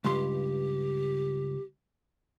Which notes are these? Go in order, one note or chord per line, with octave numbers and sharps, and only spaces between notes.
C#2 G2 G4 C6